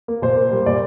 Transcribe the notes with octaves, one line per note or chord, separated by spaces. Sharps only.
A#3
A#2 C5
A#3
G3
A#2 D5